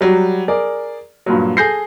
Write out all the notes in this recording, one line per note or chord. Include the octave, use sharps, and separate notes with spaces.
F#3 G3
G#4 A#4 D5
G2 A#2 F#3
G#4 A4 G6 A#6 C7